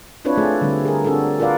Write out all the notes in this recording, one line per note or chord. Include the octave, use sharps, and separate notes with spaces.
C4 D4 E4 F4 B4 C#5
A3 F4 G#4
D3 G3 C4
G#4 A#4
C4 D4 F#4 G#4 A4
F4 A#4 B4 D5 F5 F#5